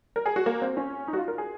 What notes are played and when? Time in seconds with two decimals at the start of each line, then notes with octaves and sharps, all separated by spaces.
0.16 A#4
0.26 G#4
0.36 F#4
0.46 A#3
0.62 C4
0.77 C#4
1.08 D#4
1.13 F#4
1.18 F4
1.28 A#4
1.38 G#4